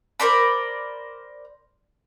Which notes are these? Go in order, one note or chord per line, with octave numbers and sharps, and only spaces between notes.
A#4 C5 D5 B5